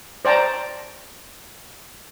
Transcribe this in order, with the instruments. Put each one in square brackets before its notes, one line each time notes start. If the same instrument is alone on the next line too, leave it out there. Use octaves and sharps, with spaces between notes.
[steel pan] C5 D5 G5 A5 A#5